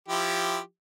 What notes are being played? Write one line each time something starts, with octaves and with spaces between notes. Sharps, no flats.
F3 E4 G4